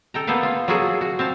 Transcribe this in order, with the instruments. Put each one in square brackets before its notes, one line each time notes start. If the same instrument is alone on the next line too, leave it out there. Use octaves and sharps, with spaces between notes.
[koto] A4 G5 A#5
A#3 B3 A4 B4 F5
F4
F#3 A#3 F4 F#4 G#4 A4
F#4
C4 F5 A5